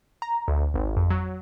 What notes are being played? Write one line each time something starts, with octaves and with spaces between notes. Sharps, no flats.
A#5
D2
G#1
F2
F#3